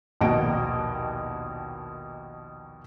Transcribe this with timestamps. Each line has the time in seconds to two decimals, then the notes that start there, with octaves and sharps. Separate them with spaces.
0.21 A#1 D#2 B2 F#4 D#5 D7